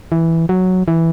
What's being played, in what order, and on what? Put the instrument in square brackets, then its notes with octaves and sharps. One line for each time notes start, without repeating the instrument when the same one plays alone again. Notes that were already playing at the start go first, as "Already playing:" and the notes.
[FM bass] E3
F#3
E3